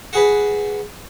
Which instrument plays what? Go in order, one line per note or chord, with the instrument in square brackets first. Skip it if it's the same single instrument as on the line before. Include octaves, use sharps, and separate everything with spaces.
[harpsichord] F#4 G#4 B4